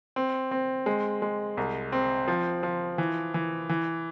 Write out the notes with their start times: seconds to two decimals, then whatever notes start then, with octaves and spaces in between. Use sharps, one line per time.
0.16 C4
0.51 C4
0.86 G#3
1.22 G#3
1.57 C2
1.92 C4
2.28 F3
2.63 F3
2.98 E3
3.34 E3
3.69 E3